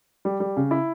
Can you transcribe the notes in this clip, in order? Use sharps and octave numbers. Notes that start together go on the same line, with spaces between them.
G3
G3
C#3
E4